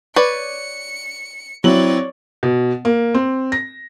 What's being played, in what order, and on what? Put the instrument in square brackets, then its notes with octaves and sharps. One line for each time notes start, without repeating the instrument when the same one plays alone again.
[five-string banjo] B4 C#5 D5 [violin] C#7
[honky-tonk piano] F#3 F#7 [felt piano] C4 E4 [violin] C#5 D5
[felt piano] B2
A#3
C4
A#6